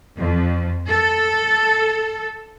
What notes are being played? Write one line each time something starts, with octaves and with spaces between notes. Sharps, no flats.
F2
A4